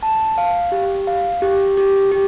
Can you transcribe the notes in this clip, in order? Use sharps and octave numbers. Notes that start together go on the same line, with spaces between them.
A5
F5
G4
F5
G4
G4
G4